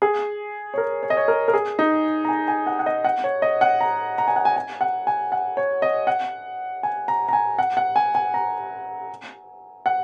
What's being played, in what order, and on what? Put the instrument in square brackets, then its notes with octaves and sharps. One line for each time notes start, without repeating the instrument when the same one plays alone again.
[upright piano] G#4
C#5
A#4
C#5
D#5
C#5
A#4
A#4
G#4
D#4
A#5
G#5
G#5
F#5
F#5
D#5
F#5
C#5
D#5
F#5
A#5
A#5
G#5
F#5
G#5
G#5
F#5
G#5
F#5
C#5
D#5
F#5
G#5
A#5
A#5
G#5
F#5
F#5
G#5
G#5
A#5
F#5